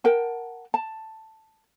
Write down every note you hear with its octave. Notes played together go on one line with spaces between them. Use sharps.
A#4 F#5 G5 A5
A5